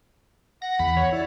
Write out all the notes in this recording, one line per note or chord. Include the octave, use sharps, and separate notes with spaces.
F#5 A#6
E2 B5
C#5
E4 D5